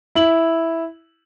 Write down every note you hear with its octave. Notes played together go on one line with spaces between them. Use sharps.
E4 F#7